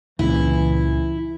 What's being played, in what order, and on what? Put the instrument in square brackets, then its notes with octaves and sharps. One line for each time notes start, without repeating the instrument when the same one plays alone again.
[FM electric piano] C#2 A#2 C#3 [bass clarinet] E3 [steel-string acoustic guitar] E4